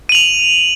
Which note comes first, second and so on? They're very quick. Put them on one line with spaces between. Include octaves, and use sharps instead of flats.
D#7 F#7 F7